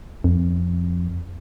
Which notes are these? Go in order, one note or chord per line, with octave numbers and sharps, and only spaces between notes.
F2